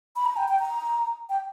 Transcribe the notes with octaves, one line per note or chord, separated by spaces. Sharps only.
B5
A#5
G5
G5
A#5
G5